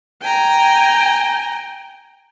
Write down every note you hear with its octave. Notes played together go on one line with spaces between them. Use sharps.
G5 G#5 A#5